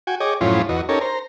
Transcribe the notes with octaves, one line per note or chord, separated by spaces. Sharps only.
F#4 G5 G#5
G#4 C#5 D#5 G5 D6
F#2 A2 F3 C#4 E4 F4
E2 F#4 D#5
C#4 D#4 G4 A4 A#4 C#5
C5 A#5